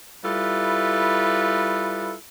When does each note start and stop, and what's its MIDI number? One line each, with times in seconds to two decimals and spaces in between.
0.24 2.15 55
0.24 2.15 64
0.24 2.15 65
0.24 2.15 69
0.24 2.15 71